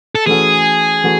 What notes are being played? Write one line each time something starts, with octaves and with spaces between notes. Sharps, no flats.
A4
E3 A3 C#4 F#4 G#4 A4
E3 A3 C#4 F#4